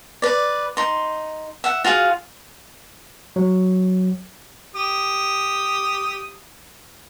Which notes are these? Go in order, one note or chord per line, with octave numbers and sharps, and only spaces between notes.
B4 D5
D#4 C6
E5 F#5
F4 F#4 G#4 F5
F#3
G4 D#6